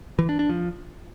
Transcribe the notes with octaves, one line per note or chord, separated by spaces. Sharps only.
E3
D4
D4
F3